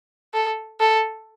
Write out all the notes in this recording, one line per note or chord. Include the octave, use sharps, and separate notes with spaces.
A4
A4